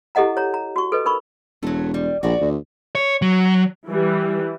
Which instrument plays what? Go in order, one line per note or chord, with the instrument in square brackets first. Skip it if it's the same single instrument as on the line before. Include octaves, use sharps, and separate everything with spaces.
[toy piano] E4 G4 A4 D#5 F#5 A#5
C#5 A#5
A#5
F#4 C#6
A4 B4 D#5
D#4 A#4 B5 C#6
[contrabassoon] E1 [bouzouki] F#3 A3
[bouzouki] G3
[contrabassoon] A#1 [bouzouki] F#4 D5
[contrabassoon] D2
[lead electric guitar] C#5
F#3
[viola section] E3 G3